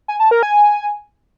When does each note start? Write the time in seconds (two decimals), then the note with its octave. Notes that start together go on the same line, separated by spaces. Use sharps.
0.08 G#5
0.20 A5
0.31 A#4
0.43 G#5